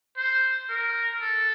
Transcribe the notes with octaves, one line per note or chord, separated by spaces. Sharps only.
C5
A#4
A4